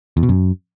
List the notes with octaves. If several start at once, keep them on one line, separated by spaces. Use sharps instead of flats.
E2
B2
F#2